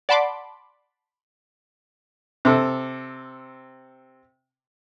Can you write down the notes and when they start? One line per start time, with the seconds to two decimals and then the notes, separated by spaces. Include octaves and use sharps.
0.09 D5 F#5 A5 B5 C6 D6
2.45 C3 A4